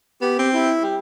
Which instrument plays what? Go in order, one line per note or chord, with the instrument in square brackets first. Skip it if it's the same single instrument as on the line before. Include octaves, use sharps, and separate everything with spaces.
[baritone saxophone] B3 [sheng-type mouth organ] G4
[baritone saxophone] C4
[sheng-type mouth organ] E4
[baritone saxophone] G3